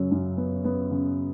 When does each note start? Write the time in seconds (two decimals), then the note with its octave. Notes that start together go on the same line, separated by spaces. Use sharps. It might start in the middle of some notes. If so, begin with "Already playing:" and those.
Already playing: F#2 C#3 F#3
0.11 F#2
0.37 B3
0.64 B3
0.91 C#3